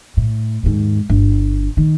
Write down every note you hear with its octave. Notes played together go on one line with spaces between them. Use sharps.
A2
D#2 G#2
G1
D#3